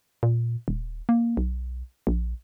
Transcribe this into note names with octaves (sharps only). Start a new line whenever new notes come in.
A#2
D#1
A#3
B1
A#1